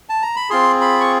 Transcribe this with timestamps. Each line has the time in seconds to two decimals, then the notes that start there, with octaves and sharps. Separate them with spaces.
0.09 A5
0.22 A#5
0.36 B5
0.50 C4 F4 G#4 C6
0.81 B5
1.01 C#6